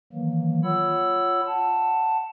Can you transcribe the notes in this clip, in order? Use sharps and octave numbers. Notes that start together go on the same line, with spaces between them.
D#3 E3 F#3 A#3
F4 C#5 F#5 B5 E6
F#5 A5